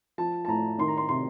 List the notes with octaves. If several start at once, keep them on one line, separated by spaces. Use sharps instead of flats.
F3 A5
A5
A2 A#5
D#3 C6
A#5
C6
C3 C6